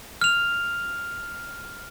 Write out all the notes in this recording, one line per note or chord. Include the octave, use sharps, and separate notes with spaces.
F6 F7